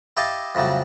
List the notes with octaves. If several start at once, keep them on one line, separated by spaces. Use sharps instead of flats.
E4 G4 C#5 D#5 F5 A5
F2 A2 C#3 F#3 G3